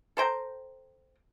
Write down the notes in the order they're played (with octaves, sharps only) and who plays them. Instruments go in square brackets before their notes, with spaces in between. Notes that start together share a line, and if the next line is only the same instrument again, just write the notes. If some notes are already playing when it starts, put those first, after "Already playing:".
[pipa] A4 C5 G5 A#5